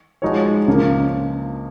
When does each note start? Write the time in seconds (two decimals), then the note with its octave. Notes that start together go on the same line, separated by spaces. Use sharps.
0.22 F3 G#3 D#4 F#4 C#5
0.68 C#2 C#3 F3 A#3